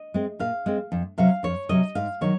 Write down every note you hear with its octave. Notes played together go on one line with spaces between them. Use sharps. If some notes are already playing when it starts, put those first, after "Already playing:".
Already playing: D#5
G#3 C4
A#2 F5
G#3 C4
F2
C3 F#3 C#4 F5
F2 C#5
C3 F#3 C#4 D#5
G#2 F5
D#3 F#3 C#5